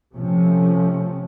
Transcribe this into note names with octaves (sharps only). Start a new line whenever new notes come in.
C3 F3 A3 C#4